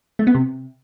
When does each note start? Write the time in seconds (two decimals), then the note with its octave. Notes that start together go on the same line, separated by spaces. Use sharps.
0.19 A3
0.27 B3
0.34 C3